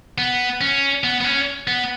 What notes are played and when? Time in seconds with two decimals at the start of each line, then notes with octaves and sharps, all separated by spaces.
0.18 B3
0.61 C#4
1.04 B3
1.21 B3
1.24 C#4
1.67 B3